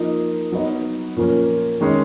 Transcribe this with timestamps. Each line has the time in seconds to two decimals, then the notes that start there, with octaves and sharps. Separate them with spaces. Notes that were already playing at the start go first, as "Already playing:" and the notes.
Already playing: F3 A#3 D#4
0.52 F#3 B3 D#4
1.17 A#2 F3 A#3 C#4
1.81 D#3 G#3 C#4